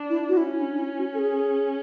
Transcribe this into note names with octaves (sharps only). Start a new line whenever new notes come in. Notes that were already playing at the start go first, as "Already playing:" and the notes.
Already playing: D4
E4
F#4
C#4 E4
D4
D4
E4
F#4
A4
G#4